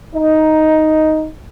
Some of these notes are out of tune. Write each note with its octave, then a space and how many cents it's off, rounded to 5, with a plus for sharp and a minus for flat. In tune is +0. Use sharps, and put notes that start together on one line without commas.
D#4 +5